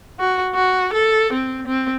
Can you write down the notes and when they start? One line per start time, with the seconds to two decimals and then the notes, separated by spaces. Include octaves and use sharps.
0.19 F#4
0.55 F#4
0.93 A4
1.33 C4
1.67 C4